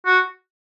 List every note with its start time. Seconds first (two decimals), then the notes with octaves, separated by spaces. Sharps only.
0.06 F#4